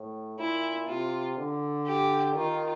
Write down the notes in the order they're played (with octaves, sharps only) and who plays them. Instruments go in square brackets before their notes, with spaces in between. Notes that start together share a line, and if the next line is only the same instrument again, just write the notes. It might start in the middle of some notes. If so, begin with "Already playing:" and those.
Already playing: [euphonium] A2
[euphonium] A#2 [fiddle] E4
[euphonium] C3 [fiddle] F4
[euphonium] D3
[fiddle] G4
[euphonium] D#3 [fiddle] F4